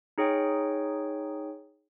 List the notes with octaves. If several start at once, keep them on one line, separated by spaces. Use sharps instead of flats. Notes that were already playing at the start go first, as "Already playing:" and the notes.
D#4 G#4 C#5 G5